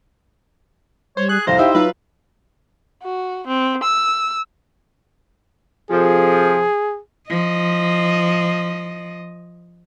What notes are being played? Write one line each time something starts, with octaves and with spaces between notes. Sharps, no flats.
G3 C5 C#5
G#4 F#6
C2 F2 C5 F5 A#5
D#4 E4 G4 E5
F#3 D#4 F4 B4
F#4
C4
E6
F2 C3 F3 G#4
F3 D#5